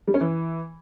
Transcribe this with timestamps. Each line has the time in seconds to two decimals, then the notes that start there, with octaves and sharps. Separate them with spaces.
0.07 G3
0.14 C#4
0.21 E3